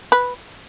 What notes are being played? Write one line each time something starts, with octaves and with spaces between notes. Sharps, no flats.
B4